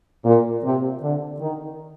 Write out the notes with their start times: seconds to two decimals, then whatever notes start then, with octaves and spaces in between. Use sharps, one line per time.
0.25 A#2
0.63 C3
1.01 D3
1.40 D#3